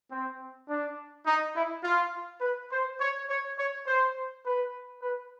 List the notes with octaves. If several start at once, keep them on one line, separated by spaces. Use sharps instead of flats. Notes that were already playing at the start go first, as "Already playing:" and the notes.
C4
D4
D#4
E4
F4
B4
C5
C#5
C#5
C#5
C5
B4
B4